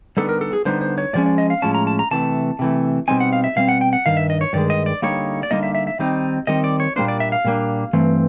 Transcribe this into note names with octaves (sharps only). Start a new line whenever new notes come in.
D3 G3 B3 D#4 A4
A#4
A4
G#4
D3 G3 B3 D#4 C5
C5
C#5
A2 F3 G#3 C#4 D5
D5
D#5
F5
A2 F3 G#3 C#4 A5
A#5
A5
A#5
C3 E3 A3 A5
C3 E3 A3
B2 G3 C4 D#4 G#5
F#5
F5
E5
B2 G3 C4 F5
F#5
G5
F#5
G2 D#3 F5
E5
D#5
C#5
G2 D#3 G#3 D5
D#5
D5
D3 G3 A#3 D#4 C#5
D5
D3 G3 A#3 D#4 D#5
E5
E5
E5
D#3 G3 C4 D#4
D#3 G3 C4 D#4 D#5
D5
C#5
A#2 G3 A#3 D4 C5
D5
E5
F5
A#2 G3 A#3 D4
G2 E3 A3 C4